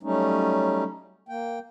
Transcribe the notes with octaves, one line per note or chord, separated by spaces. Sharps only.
F#3 G3 A3 C#4 D#4
A#3 G5